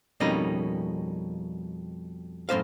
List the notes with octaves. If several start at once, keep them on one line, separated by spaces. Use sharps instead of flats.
F2 B2 G3 A#3 C#4 D#4
F#2 A2 C5 F5